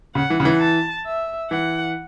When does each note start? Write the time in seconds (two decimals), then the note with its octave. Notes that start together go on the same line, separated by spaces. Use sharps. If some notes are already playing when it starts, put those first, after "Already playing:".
0.15 C#3 F#5
0.30 E3
0.40 C#3
0.45 E3
0.61 A5
1.06 E5
1.51 E3 F#5